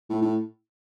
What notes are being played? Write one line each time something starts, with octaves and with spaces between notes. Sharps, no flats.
A2
A2